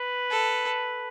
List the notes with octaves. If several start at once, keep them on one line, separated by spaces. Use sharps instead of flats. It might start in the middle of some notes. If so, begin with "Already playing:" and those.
Already playing: B4
A4